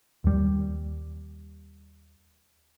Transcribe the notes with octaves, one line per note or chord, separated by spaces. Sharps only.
D#2 G3